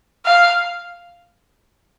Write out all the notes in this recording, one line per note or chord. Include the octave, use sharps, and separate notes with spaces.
F5